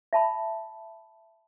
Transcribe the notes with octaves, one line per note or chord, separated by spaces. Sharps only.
E5 A5 B5